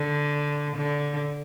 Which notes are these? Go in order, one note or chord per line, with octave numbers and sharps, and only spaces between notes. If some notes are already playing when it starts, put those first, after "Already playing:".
Already playing: D3
D3